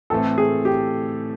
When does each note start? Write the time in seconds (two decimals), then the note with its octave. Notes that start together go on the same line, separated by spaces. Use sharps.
0.10 A2 E3 A3 C4 A4
0.38 G#4
0.65 G4